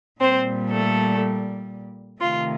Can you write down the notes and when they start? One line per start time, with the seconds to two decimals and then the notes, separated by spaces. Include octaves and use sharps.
0.20 A#2 G3 C4 C5
0.71 A3 A4
2.21 C3 D#3 A3 F4